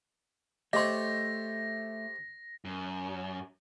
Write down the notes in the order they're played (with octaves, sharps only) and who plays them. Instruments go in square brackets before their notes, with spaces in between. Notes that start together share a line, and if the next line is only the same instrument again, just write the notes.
[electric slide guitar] A3 [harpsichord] G4 C5 C#5 [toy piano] D#5 C6 [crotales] A#6
[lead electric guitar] F#2